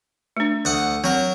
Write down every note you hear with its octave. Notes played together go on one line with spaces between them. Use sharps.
A3 D4
D2 F#5 D#6
F#3 C4 A#4